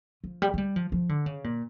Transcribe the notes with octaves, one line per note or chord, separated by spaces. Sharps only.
F3
G3
A3
G3
F3
F3
D3
C#3
A#2